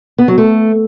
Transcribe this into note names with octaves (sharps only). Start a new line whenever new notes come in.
B3
F#3
A3